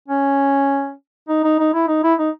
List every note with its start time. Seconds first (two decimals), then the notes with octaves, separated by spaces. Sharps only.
0.08 C#4
1.28 D#4
1.44 D#4
1.59 D#4
1.74 E4
1.88 D#4
2.04 E4
2.19 D#4